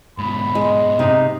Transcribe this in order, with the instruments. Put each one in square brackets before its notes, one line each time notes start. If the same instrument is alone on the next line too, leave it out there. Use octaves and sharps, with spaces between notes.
[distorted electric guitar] G#2 B2 [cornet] B5
[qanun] G#3
[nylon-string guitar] C3 [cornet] D#4